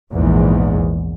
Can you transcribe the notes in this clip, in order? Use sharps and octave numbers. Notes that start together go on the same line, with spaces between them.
A#1 E2 G#2